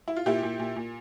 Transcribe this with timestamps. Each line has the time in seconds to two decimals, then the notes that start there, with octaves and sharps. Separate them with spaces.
0.08 E4
0.16 F4
0.26 A#2 E4 G4
0.43 A#2
0.59 A#2
0.76 A#2